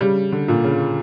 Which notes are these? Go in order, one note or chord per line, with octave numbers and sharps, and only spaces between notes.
C#3 G3
D3
A#2
C#3